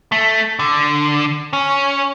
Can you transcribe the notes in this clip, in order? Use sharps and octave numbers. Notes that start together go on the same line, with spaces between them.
A3
D3
C#4